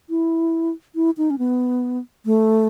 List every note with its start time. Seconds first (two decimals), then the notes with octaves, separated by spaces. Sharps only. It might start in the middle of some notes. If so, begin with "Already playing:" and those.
0.10 E4
0.95 E4
1.18 D#4
1.30 C#4
1.38 B3
2.25 A3